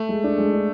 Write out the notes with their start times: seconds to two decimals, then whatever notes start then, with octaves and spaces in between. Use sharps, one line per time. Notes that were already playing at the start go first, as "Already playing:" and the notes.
Already playing: A3
0.09 G#3
0.24 D4
0.38 G#3
0.53 D4